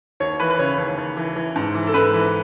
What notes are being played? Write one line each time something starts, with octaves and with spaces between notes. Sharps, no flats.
D#2 C#5
E3 B4
B4
C#3 C#5
D#2
D#2
E3
E3
G#2
E3
A4
G#2 B4
E3